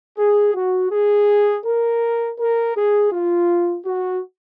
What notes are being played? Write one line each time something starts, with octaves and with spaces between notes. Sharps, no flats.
G#4
F#4
G#4
A#4
A#4
G#4
F4
F#4